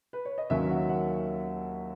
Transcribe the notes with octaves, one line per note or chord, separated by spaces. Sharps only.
B4
C#5
D#5
D#2 D#3 F#3 A#3 C#4 E5
F#5
F#5